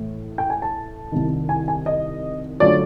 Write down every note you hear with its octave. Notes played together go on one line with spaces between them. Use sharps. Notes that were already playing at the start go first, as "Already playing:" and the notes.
Already playing: A2 E3 A3
G5
G#5
A5
C2 C3 D#3
G#5
G#5
D#5
D3 F#3 A3 C#4 F4 D5